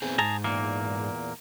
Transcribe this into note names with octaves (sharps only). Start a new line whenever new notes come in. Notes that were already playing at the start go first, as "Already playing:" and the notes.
B3 C4 G#4
G#2 G#4 A5 A#5
E2 A#2 A#3